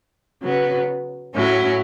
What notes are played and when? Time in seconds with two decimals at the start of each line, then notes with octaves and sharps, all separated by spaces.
0.42 C#3 F#3 B3
1.34 A2 F#3 C#4 E4